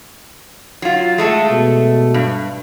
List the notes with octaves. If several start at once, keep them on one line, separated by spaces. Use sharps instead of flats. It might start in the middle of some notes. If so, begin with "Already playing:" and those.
F#3 F4
G#3 A3 A4
B2
G2